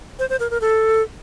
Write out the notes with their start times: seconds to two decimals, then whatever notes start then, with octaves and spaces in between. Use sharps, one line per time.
0.19 C5
0.30 C5
0.40 A#4
0.50 A#4
0.61 A4